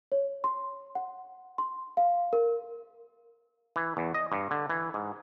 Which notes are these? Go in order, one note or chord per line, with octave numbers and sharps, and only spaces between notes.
C#5
C6
F#5
C6
F5
A#4
E3
E2
D#5
G2
D3
E3
G#2